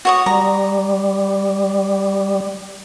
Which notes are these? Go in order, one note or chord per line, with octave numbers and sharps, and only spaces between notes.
F#4 C#5 D#6
G3 A#5